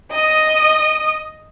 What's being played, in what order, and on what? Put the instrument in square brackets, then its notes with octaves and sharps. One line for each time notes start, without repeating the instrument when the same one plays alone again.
[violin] D#5 D#6